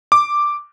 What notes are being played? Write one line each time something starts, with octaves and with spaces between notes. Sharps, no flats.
D6